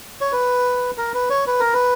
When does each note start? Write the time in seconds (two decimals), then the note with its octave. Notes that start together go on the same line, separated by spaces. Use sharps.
0.21 C#5
0.32 B4
0.98 A#4
1.14 B4
1.30 C#5
1.47 B4
1.60 A#4
1.74 B4